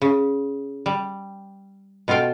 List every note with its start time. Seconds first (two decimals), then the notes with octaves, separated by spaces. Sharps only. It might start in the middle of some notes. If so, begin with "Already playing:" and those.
0.02 C#3
0.86 G3
2.08 B2 F4 A4 F5 G5